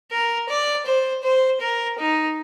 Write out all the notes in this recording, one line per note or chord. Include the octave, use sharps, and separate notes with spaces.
A#4
D5
C5
C5
A#4
D#4